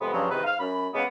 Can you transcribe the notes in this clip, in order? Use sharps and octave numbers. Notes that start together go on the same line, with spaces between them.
F2 C3 G#3 B3
G2 C#3 F3 F#3
E2 C3 D#3 D#4 B4
G#2 F5
F#2 B5
C#3 G#3 A#3 B3